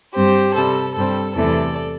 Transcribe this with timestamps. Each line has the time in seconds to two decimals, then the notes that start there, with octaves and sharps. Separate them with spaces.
0.16 G2 G3 C4 G4 C5
0.56 C3 G3 C4 A4
0.96 G2 G3 C4 A4
1.36 E2 C3 E3 A3 A4 D5